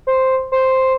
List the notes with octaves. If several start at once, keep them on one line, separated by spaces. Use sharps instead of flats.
C5
C5